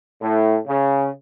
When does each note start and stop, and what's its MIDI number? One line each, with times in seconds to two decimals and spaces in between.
0.21 0.58 45
0.68 1.09 49